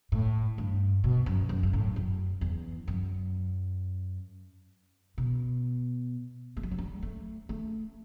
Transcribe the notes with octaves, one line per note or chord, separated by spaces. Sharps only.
A2
G2
B2
F#2
F#2
G2
A2
F#2
E2
F#2
B2
A3
G3
F#3
G3
A3
A3